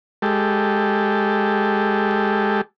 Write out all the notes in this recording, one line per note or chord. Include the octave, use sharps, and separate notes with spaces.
G#3 G4 A4